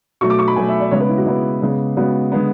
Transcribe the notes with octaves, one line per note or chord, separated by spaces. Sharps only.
B2 F#3 A3 C#6
D6
C#6
B5
B2 F#3 A3 G#5
E5
D5
C#3 G#3 B3 C#5
B4
E4
F#4
C#3 G#3 B3 E4
C#3 G#3 B3
C#3 G#3 B3 F#4
D3 G#3 B3